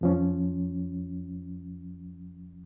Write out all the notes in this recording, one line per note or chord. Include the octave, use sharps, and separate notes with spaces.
F2 F3 C#4